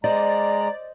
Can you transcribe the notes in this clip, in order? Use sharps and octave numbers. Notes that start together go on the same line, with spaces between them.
G#3 C5 D5 D#5 A#5